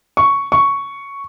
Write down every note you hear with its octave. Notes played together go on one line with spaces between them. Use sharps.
C#6
C#6